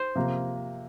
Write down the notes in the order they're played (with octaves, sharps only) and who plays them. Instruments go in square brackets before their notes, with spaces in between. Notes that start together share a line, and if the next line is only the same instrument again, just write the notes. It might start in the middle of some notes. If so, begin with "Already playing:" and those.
Already playing: [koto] C5
[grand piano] C3 F3 A#3